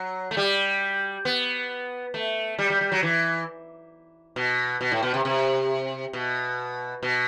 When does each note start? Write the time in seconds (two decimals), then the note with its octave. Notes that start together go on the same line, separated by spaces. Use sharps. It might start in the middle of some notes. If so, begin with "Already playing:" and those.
Already playing: F#3
0.31 A3
0.37 G3
1.25 B3
2.14 A3
2.59 G3
2.70 G3
2.81 G3
2.92 F#3
3.03 E3
4.36 B2
4.81 B2
4.92 A2
5.03 B2
5.14 C3
5.25 C3
6.13 B2
7.03 B2